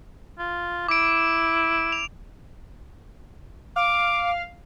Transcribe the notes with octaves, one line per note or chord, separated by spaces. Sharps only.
F4
E4 D6 D7
F7
F5 D6